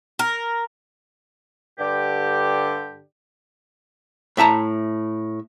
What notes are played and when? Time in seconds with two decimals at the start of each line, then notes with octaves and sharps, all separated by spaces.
0.19 A#4
1.79 G2 D3 G4
4.37 A2 E5 A5 A#5